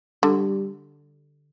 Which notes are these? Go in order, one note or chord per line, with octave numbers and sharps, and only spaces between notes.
D3 G3